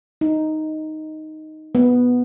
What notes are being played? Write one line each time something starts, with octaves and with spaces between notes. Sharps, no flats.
D#4
B3